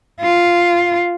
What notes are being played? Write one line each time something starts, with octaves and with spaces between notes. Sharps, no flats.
F4